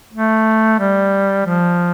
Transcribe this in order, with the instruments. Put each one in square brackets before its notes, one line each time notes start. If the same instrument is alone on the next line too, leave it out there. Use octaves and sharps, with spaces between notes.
[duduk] A3
G3
F3